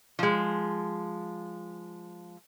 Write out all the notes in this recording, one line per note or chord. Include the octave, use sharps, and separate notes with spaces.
F3 G#3